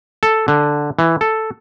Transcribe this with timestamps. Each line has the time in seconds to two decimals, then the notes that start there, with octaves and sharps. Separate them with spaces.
0.23 A4
0.48 D3
0.99 E3
1.21 A4